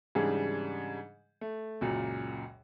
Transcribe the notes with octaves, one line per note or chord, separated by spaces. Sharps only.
G#2 C#3 E3 G3 D4 G#4
A3
C#2 F#2 A#2